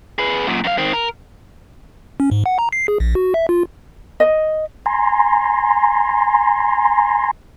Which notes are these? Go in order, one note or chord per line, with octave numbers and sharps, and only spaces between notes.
G#4 B4
F#2 A#2
F#2 F5
D#3 C4
A#4
C#4
G#2
F#5
A#5
C7
G#4
A#1
F#4
E5
F4
D#5
G#5 A#5 C6